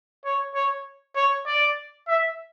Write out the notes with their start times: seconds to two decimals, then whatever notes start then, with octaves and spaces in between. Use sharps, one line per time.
0.25 C#5
0.55 C#5
1.16 C#5
1.46 D5
2.08 E5